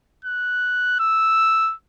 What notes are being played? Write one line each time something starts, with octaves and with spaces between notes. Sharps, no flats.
F#6
E6